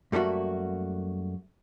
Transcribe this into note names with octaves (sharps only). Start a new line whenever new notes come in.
F#2 G3 A3 A#3 F#4